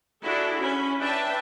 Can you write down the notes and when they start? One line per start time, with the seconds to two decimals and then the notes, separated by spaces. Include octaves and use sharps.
0.23 D4 E4 F#4 G#4 A4
0.60 C#4 B5
0.99 D4 B4 E5 G5 A5